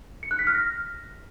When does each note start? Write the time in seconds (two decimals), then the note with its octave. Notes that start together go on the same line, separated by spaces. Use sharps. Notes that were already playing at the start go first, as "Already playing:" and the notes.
0.23 C#7
0.31 F#6
0.39 B6
0.47 F6
0.55 A#6